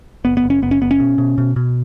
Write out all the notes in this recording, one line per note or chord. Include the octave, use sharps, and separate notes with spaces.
F#1 B3
B3
F#1
C#4
F#1 B3
C#4
F#1 B3
C#4
B2
B2
B2
B2